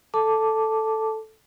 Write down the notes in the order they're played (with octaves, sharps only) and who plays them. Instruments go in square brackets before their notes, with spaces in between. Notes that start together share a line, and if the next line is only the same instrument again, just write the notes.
[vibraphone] A4 A5 D6